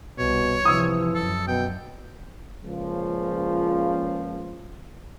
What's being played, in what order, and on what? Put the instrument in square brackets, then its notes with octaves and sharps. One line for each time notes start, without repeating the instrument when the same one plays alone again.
[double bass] C2 [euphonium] B2 [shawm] C#5
[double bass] C3 F3 [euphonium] E3 [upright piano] D#6 E6
[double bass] F#2 [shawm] A4
[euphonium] B2 [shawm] G5
[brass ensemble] C#2 A#2 C#3 F3